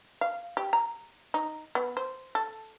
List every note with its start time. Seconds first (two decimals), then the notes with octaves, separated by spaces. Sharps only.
0.21 F5
0.57 G4
0.73 A#5
1.34 D#4
1.75 B3
1.97 C5
2.35 A4